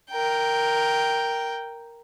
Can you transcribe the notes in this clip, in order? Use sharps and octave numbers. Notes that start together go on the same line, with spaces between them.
A#4 G5